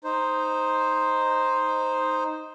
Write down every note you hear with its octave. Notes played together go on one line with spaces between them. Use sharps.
D#4 C5